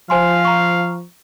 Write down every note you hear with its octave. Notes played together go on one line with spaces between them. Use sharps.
F3 C5 F5 G#5 C6
A#5 C#6